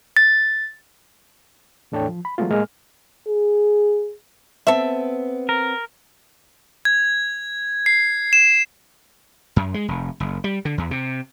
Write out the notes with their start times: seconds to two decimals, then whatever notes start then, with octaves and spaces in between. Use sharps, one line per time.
0.17 A6
1.92 E2 A2 D4 A4 C#5 G5
2.08 F3
2.25 B5
2.38 E3 F#3 G#3 A3 B3 F4
2.50 A2 G#3 A#3 F6
3.27 G#4
4.67 B3 C4 A4 E5
5.49 A#4
6.85 G#6
7.86 C7
8.33 E7
9.56 F#2
9.74 G#3
9.88 F1
10.20 F#1
10.44 G3
10.65 D3
10.78 E2
10.91 C3